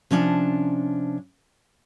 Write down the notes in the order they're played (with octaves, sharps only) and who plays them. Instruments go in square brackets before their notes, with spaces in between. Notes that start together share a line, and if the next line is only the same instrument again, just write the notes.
[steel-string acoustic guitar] C3 F3 C#4 D4 D#5 A5